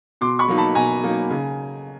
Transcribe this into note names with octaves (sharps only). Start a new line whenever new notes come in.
B2 C6 D6
B5 C#6
F#3 A#3 D#4
A5 B5
B2 G#5 A#5
F#3 A#3 D#4
C#3